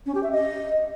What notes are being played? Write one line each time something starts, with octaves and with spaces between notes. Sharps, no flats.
C#4
G4
E5
D#5